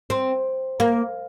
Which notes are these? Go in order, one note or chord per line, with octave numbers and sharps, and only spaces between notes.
C4
A#3